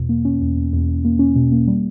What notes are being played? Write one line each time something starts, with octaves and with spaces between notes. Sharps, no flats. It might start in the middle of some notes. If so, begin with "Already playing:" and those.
Already playing: E2 B2
A#3
C#4
E2
E2
E2
E2
A#3
C#4
B2
A#3
G3